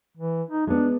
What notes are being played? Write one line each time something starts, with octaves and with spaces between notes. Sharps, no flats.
E3
D#4
G#3 B3 D4